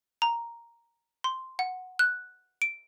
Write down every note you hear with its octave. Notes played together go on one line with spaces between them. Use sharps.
A#5
C6
F#5
F#6
D7